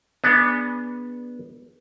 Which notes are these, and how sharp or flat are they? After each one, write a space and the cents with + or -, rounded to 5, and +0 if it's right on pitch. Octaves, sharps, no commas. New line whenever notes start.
B3 -15 D4 +0 G#4 +0